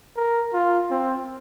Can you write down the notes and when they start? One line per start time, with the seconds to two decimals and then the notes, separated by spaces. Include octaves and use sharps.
0.16 A#4
0.53 F4
0.91 C4